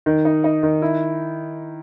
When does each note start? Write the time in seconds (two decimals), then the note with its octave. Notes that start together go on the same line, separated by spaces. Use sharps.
0.06 D#3
0.25 D#4
0.44 D#4
0.63 D#3
0.82 E4